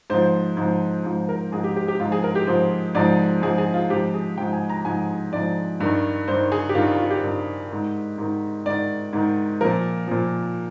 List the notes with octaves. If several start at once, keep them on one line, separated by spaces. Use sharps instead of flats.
G#2 F3 C5
G#2 F3
G#2 F3
A#4
G#2 F3 G#4
G4
G4
G4
G#2 F3 F4
G#4
A#4
G4
G#2 F3 C5
G#2 F3 D5
G#2 F3 G#4
G#4
F4
G#2 F3 G4
G#4
G#2 F3 G5
G#5
A#5
G#2 F3 G#5
G#2 F3 D5
G2 D#3
G2 D#3 C5
G#4
G4
G2 D#3 F4
F4
F4
G4
G2 D#3
G#2 D#3
G#2 D#3
G#2 D#3 D5
G#2 D#3
A#2 F3 A#4
A#2 F3